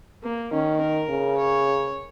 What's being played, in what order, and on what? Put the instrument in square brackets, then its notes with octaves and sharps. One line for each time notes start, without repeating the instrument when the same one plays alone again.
[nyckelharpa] A#3
[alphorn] D#3 [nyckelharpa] C#4
[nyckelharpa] A#4
[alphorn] C#3
[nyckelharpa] C#5